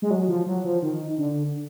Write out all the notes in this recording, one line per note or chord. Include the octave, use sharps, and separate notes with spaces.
G#3
F#3
F3
F#3
F3
D#3
D3